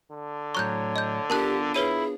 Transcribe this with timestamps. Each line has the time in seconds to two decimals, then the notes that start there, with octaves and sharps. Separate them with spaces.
0.11 D3
0.55 A2 F#3 C#5 A#5 C#6 F#6 G6
0.96 D#5 G6
1.30 B3 D4 F4 G4 A#4 A5 F#6
1.74 E4 G#4 B4 C#5 D#7